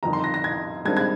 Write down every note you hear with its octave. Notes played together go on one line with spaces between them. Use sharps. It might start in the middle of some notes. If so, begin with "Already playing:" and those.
G1 F2 D#3 A#5
C6
A#6
A#6
G#6
G2 D#3 G#3 C4 G#6
G#6